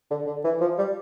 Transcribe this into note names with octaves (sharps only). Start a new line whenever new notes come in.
D3
D3
E3
F3
G3